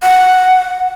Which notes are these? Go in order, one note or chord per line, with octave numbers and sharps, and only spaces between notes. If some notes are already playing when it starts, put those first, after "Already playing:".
F#5